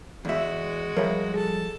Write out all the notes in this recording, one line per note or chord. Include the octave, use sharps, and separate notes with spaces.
E2 G#3 F#4 E5
F3 G3 A#4 C#5 E5
G#4 A4 A5